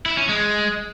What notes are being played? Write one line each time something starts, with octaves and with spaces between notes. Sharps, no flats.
E4
C#4
G#3